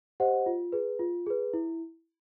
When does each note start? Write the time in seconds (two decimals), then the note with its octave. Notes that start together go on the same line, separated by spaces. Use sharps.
0.20 G4 C5 D#5 F#5
0.46 F4
0.72 G#4 B4
0.99 F4
1.26 G#4 B4
1.54 E4